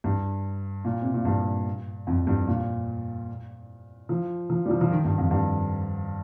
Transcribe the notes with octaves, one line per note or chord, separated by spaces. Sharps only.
G2
A#2
C3
A#2
G2
F2
G2
A#2
F3
F3
G3
F3
F3
D#3
G2
F2
G2